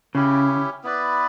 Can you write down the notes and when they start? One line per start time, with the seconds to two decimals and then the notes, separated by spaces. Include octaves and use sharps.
0.15 C#3 C#4 E4 G4
0.84 B3 E4 B4 D5